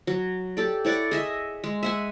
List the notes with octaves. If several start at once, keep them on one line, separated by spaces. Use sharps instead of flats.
F#3
G4 A4 D5
E4 C#5 D5 F#5
G#4 D#5 E5
G#3
E5 F#5 G#5